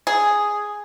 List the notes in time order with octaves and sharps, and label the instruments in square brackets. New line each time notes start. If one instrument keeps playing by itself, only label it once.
[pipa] G#4